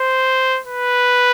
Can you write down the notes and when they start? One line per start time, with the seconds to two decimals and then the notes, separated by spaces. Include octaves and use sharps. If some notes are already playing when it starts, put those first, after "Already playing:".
Already playing: C5
0.67 B4